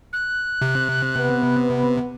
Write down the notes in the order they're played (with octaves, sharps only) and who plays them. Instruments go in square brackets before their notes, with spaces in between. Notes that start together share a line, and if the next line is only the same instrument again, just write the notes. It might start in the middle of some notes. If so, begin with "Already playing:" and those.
[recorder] F#6
[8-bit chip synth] C3
[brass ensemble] B3